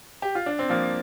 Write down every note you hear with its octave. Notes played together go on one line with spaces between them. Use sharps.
G4
F4
D4
C4
F3 A#3